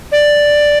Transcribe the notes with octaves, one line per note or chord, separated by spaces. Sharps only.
D5